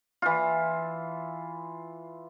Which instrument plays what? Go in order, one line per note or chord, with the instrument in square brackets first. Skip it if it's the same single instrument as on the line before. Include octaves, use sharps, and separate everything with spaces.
[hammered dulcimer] E3 F4